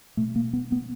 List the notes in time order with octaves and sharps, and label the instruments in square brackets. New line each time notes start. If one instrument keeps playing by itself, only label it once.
[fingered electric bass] B2 A3
A#3
B3
B3